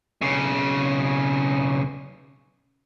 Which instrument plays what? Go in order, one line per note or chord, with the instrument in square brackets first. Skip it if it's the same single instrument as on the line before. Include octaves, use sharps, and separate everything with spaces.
[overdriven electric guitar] B1 C#3